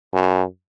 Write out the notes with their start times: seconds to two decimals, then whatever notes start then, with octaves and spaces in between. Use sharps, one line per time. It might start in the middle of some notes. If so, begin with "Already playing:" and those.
0.13 F#2